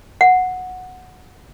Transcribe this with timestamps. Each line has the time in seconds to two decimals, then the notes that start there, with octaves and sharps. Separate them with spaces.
0.21 F#5